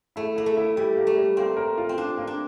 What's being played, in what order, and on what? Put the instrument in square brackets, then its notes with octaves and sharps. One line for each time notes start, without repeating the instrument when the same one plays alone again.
[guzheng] A3 [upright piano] E4
[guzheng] A#3 [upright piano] E4
[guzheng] A3
[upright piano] E4
[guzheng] G3 [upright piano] E4
[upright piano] A#3
[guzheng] A3
[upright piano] G3
[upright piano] A#3 [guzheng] C4
[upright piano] A#4
F4
[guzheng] C4
[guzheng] D4 [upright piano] F4
[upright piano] A#3
[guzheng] D4